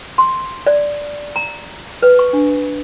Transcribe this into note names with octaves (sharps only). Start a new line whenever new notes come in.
C6
D5
A#5
B4
C#6
D4